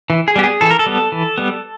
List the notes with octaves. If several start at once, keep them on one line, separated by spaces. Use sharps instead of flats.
E3
G#4
G3 B3 G4
G#4
E3 A4
A#4
A4
G3 B3
E3
G3 B3